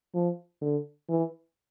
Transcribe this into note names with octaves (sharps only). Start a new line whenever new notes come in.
F3
D3
E3